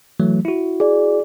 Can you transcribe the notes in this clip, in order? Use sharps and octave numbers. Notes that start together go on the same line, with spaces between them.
E3 F#3 A3
E4 F#4
G#4 D5